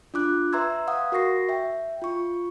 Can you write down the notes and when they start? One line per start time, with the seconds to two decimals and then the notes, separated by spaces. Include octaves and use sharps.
0.14 D4 F4 D6 F#6
0.53 B4 E5 A#5 C6 E6 G#6
0.88 F5 F#5 D#6
1.12 F#4 A#4 C#6 A#6 C7
1.49 E5 G5
2.02 F4 C#6